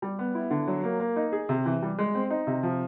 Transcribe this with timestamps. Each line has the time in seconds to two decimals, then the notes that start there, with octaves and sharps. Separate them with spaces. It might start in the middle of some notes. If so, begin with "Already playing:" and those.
0.02 G3
0.19 B3
0.35 E4
0.51 D3
0.67 F#3
0.84 A#3
1.00 A#3
1.16 D#4
1.32 G#4
1.49 C3
1.65 E3
1.82 G3
1.99 G#3
2.15 C4
2.30 D#4
2.47 C3
2.63 F3